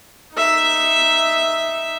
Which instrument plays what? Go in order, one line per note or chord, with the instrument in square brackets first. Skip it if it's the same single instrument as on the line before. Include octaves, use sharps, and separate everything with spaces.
[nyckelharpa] D#4 E5